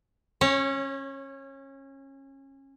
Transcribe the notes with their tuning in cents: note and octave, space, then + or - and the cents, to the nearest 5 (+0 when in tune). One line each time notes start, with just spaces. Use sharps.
C#4 -25 C#5 +0